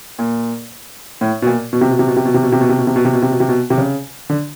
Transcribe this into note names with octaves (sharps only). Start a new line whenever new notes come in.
A#2
A2
B2
A#2
B2
C3
B2
C3
B2
C3
B2
C3
B2
C3
B2
C3
B2
C3
B2
C3
B2
C3
B2
C3
B2
C3
C#3
D3